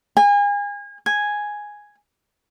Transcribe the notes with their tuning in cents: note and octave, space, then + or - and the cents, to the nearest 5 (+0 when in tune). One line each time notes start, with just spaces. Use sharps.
G#5 -35
G#5 +0